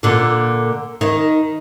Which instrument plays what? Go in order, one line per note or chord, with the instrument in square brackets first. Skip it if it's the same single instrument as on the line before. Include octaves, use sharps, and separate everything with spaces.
[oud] A#2 D3
D#3